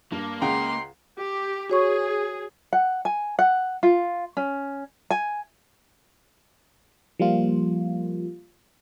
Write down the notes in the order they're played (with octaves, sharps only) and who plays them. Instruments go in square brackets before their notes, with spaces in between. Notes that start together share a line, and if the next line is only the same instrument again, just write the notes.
[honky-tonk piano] G2 [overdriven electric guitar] A#3
[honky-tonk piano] C#2 C#3 [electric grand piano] F#5 G5 A#5 [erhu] C6
[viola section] G4
[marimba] F#4 C#5 C#6 [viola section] G#4
[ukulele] F#5
G#5
F#5
F4
C#4
G#5
[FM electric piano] F3 G3 A#3 F4